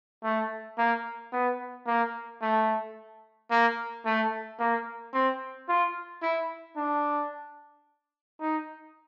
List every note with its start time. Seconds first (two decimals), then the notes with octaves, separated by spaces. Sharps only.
0.24 A3
0.78 A#3
1.33 B3
1.87 A#3
2.42 A3
3.51 A#3
4.06 A3
4.59 A#3
5.13 C4
5.69 F4
6.22 E4
6.77 D4
8.40 D#4